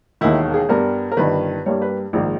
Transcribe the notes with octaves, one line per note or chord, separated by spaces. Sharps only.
E1 D#2 D#3 E4
G#4
G2 G3 B3 A#4
A#4
G1 G2 D#3 B4
G2 G3 A#3 C#5
B4
A#1 G#2 D#3 A#3